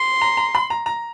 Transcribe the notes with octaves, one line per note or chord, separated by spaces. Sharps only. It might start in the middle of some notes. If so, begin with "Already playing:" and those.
Already playing: C6
A#5
A#5
B5
A#5
A#5